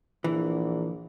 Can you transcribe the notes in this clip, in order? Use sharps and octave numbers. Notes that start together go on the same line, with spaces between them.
A#1 E3